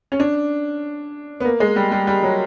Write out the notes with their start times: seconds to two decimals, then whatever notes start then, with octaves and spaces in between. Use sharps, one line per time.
0.12 C#4
0.20 D4
1.40 B3
1.45 A#3
1.60 G#3
1.76 G3
1.92 G3
2.07 G3
2.23 F#3